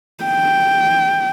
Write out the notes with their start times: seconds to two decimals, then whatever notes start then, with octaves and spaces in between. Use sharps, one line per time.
0.24 G5